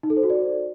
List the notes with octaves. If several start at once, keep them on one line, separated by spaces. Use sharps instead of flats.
D#4
A4
C5
F#4
D5